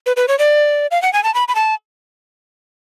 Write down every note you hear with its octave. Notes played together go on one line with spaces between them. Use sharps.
B4
B4
C#5
D5
F5
F#5
G#5
A5
B5
B5
A5